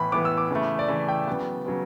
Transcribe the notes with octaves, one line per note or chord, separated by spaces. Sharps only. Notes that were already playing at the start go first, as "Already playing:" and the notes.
Already playing: A2 E3 B3 B5
A2 E3 B3 D6
E6
D6
C#3 E3 A3
D5
C#3 E3 A3 E5
G5
C#3 F#3 B3
C#3 F#3 B3